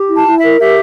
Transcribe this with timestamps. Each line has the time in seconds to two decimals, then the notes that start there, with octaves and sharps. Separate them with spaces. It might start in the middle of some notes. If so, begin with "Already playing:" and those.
Already playing: G4
0.09 E4
0.15 A5
0.27 E4
0.38 E5
0.44 A#4
0.60 G4 E5